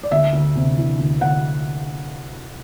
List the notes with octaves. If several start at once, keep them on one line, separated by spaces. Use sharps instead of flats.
D5
D2 E5
D2
C3
E3
D2
D2 F#5